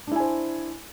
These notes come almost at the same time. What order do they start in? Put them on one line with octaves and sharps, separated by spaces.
D4 E4 G#5 C5